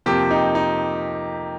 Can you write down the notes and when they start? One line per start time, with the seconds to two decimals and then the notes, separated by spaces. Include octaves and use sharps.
0.06 F2 C3 F3 A#3 G4
0.31 D#4
0.55 D#4